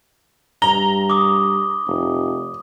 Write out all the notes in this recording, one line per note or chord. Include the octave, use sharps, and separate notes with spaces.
G2 A#5 G7
D6 D#6
F1